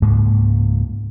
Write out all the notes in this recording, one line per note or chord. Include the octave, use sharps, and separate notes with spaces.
C#2 G#2 G#3 A#3